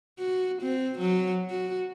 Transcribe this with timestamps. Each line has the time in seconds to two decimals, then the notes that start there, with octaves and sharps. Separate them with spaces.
0.20 F#4
0.62 C4
0.99 F#3
1.51 F#4